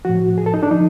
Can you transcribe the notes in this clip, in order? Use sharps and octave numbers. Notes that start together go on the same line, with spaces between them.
A2 F3 F#4
G#4
A4
D#4
D4
F3 D#4